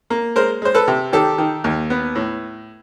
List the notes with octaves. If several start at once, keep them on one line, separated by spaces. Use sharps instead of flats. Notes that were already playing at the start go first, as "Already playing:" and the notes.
A#3
G#3 A#4 C5
G#3 C5
A4 B4
C3
D#3 G4 A4
D#3
D#2
B3
A2